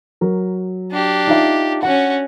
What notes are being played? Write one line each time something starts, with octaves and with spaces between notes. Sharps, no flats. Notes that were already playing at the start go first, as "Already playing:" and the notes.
F#3 A#4
D4 G4
D#4 F4 E5
C#4 F#4 F#5